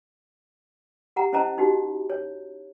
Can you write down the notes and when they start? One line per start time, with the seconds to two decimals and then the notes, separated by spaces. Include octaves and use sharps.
1.16 G4 F#5 A#5
1.33 C#4 E4 C5 D#5 A5 A#5
1.58 D#4 F#4 G4
2.10 C#5